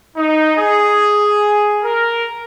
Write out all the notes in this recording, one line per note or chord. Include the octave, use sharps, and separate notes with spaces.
D#4
G#4
A#4